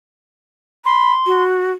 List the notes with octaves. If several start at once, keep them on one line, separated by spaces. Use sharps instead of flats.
B5 C6
F#4